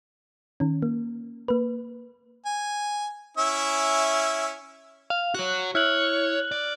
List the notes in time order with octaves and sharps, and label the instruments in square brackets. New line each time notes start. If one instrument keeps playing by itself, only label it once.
[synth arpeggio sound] D#3 C#4
A#3
A#3 B4
[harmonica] G#5
C#4 E4 E5
[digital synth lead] F5
[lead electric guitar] F#4 C#5 [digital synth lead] F#6
[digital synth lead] E4 [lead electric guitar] C#5 [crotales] F6 F#6 F#7
[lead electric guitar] D5